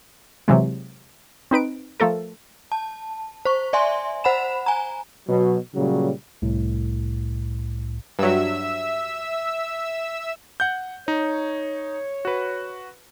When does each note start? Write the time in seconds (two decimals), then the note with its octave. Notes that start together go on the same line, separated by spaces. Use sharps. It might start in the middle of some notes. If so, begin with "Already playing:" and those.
0.48 C3 E3 F#3 G#3
1.51 C4 D#4 B4 D7
2.00 F3 A3 A4 A#4
2.72 A5
3.45 C5 C#6
3.73 D5 E5 G#5 C6
4.24 C5 F#5 B5 E7
4.66 G#5 A#5
5.28 B2 F#3
5.75 A#2 C#3 F#3 G3
6.42 C2 A2
8.19 G2 F#3 E5 E6
10.60 F#5 G6
11.08 D#4 C#5
12.25 F#4 B4